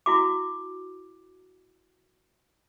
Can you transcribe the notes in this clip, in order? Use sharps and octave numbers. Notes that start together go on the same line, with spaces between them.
E4 F#4 D6